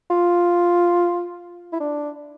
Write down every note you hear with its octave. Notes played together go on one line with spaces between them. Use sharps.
F4
E4
D4